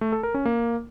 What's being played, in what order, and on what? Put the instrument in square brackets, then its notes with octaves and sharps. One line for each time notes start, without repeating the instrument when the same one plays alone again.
[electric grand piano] A3
A4
A#4
C#4
A#3